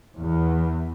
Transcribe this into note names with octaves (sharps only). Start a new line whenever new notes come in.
E2